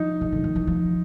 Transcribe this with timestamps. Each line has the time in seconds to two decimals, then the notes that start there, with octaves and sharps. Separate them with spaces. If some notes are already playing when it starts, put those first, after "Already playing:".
Already playing: F3 D#4
0.21 C#3
0.32 D3
0.44 D#3
0.55 E3
0.67 F3